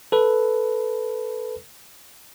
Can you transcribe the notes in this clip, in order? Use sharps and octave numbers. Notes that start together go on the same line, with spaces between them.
A4 B4